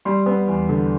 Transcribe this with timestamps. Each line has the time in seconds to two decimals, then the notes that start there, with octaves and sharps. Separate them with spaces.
0.05 G3 C6
0.26 B3
0.47 E2
0.69 D3